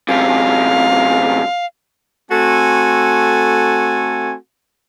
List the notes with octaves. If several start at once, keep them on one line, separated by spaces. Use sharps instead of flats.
F#2 C3 F5
A3 C4 F#4 A4 G#5